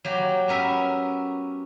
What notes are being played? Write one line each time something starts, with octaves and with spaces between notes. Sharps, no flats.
F#3 A#3 G4
B3 C#4 A#4 E5